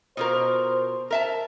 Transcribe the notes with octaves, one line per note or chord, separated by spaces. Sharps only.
B2 F4 A#4 C5
A#4 E5 A5